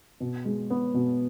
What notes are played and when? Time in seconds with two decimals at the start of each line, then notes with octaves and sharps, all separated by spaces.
0.20 B2
0.45 G#3
0.70 B3
0.94 B2